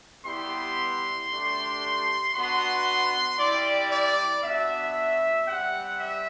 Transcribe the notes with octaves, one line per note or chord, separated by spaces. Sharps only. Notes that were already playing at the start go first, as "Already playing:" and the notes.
G3 B3 E4 G4 C6
A3 D4 G4
B3 D4 F#4 C6
G3 C4 E4 D5
D5
B3 D4 F#4 E5
G3 C4 G4 F#5
E5